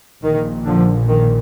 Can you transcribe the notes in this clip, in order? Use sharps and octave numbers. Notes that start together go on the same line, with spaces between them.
A#1 A#2 D#3
D3 F3
D#3